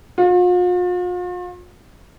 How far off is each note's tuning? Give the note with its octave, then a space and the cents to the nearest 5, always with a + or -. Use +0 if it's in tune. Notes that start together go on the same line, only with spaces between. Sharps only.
F4 +45